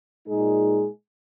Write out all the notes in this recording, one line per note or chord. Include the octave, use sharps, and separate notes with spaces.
A#2 G#3 D#4 G#4